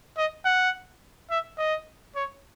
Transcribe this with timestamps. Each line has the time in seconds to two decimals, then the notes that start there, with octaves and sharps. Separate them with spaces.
0.17 D#5
0.45 F#5
1.31 E5
1.58 D#5
2.16 C#5